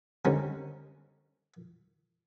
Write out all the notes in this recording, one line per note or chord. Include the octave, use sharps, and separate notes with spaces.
D3 D#3 G3 C4 C#4 A#4